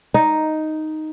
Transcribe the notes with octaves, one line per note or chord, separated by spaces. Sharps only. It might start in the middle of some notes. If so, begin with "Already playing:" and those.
D#4